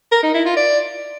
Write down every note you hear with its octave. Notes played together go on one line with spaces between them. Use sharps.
A#4
D#4
E4
F4
D5